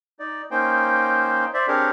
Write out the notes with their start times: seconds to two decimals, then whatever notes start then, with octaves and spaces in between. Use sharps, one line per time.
0.19 D#4 D5
0.51 A#3 C#4 D#4 C5 G5
1.54 C5 D5 E5
1.68 C4 D4 G4 G#4 A#4 C#5